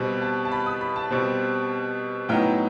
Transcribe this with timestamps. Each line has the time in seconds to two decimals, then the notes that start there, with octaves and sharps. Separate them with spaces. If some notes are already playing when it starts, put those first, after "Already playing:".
Already playing: B2 G3 C4
0.22 A5
0.45 A5
0.52 B5
0.66 D#6
0.81 B5
0.96 A5
1.11 B2 G3 C4
2.29 A2 F#3 B3 D#4 G5